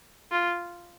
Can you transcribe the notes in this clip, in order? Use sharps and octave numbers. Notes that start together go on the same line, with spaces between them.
F4